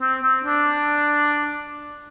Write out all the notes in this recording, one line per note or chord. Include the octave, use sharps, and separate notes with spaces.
C4
C4
D4